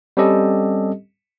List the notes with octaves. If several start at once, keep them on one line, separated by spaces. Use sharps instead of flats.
G3 C4 C#4 G4 A4 D#5